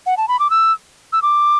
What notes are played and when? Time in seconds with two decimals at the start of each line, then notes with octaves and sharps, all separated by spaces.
0.06 F#5
0.17 A5
0.28 B5
0.39 D6
0.50 E6
1.13 E6
1.22 D6